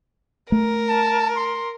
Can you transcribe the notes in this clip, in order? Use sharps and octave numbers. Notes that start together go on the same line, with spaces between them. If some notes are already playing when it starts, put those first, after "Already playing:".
A3 A#4
A5
C6